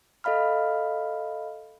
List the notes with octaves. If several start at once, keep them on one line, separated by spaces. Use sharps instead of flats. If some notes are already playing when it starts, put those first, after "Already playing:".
A4 D#5 F5 B5 F6